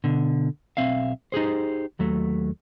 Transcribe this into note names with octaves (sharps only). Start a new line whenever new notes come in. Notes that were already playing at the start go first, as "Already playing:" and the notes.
B2 D3
B1 C4 E5 F5
D#4 G4 G#4 C5
D#2 F#3 A3